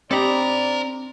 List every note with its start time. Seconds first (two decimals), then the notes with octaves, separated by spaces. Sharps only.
0.11 C4 D4 D#4 G4 A4 D5 A#5 B5